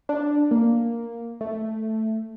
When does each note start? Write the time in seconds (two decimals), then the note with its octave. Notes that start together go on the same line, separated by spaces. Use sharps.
0.09 D4
0.51 A#3
1.41 A3